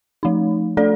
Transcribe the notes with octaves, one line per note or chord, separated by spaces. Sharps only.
F3 A3 D#4
A3 D4 A4 D5